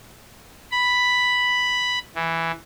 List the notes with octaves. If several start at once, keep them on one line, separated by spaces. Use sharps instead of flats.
B5
E3